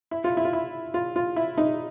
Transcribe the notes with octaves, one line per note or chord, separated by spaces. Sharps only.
E4
F4
E4
F4
E4
F4
F4
E4
D#4